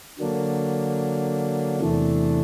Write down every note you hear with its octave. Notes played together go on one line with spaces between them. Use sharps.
D3 F#3 A#3 D4
E2 C3 E3 A3 D4